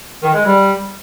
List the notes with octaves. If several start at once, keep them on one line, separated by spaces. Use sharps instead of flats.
D#3
G#3
G3